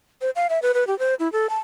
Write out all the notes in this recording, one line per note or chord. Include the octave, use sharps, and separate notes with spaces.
C5
F5
E5
B4
B4
G4
C5
E4
A4
A5